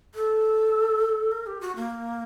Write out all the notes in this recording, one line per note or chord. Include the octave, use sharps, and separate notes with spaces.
A4
A#4
G4
F#4
A#3